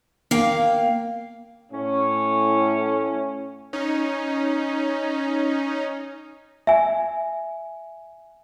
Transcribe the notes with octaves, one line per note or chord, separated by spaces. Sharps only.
A#3 F5 G5
A2 C#4
C#4 D#4
E5 G#5